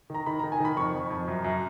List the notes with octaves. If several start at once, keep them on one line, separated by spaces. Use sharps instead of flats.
D#3 A#5
D#3 B5
A#5
D#3
G#5
D#3 B5
F2 C#6
F2
F2
F#2
F#2